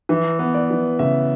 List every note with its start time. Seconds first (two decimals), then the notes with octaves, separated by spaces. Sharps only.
0.09 E3 E5
0.39 B3
0.54 D5
0.70 E3
0.99 C#3 E5